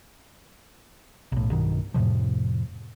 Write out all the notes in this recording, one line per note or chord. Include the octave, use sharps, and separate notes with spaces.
B1 A2
B1 G2 B2 D#3
F2 A2 C3 F3